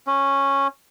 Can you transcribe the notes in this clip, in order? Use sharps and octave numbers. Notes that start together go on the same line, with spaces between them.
C#4